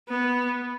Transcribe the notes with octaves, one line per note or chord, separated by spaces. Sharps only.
B3